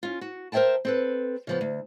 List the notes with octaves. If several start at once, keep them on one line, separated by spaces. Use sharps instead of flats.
C#4 F4
F#4
A#4 C5 C#5 E5 G5 A5
C4 A4 B4
C#3 F3 B3
D2